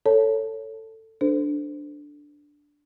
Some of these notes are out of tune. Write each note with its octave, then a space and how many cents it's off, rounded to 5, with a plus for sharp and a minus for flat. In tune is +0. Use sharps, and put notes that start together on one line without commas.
A4 +15 C#5 +0 A5 +0
D4 +0 A4 +0 C5 -25